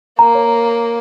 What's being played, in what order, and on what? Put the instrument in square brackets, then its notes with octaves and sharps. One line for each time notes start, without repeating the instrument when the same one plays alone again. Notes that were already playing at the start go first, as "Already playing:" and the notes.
[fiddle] A#3 [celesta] A#5
[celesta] C#5